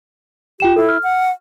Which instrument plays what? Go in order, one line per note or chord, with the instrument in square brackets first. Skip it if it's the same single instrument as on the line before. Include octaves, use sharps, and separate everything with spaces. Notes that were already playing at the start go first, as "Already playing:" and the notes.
[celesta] F4 G5 E7 [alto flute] G4
[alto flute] E4 [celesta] A4
[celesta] F6
[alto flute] F#5